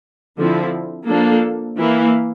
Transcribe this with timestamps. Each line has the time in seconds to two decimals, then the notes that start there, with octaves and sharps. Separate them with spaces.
0.37 D3 F3 C4 E4
1.08 F3 A#3 D4 A4
1.79 E3 A#3 E4